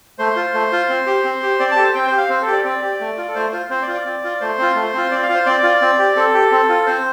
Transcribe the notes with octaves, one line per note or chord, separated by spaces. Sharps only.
A3 C5
F4
A3
F4
C4
G4
C4
G4
C4 D5
A5
G4 A4
C5
C4 G5
G4 C5
F5
C4 C5
A4
G4
D5
C4 D5
G4
A3
F4
A4
A3 C5
F4 C5
C4 C5
D5
F4
D5
C4
F4
A3 C5
C4 F4
A3
C4 F4
C4 D5
F5
F4
C5
C4 D5
F4
C4
G4
C4 A4
G4
C4
F4
C4 C5